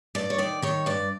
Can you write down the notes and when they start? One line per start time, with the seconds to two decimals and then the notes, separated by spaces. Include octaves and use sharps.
0.15 G2 D5
0.30 C#5
0.38 D#3 D5
0.62 D#3 C#5
0.86 G2 D5